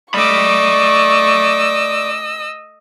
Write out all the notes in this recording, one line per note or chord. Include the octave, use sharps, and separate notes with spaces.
A3 D5 D#5 B5 C#6 D6 E6